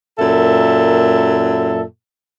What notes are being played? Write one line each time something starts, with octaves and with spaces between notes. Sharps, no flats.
F#2 A#2 A4 E5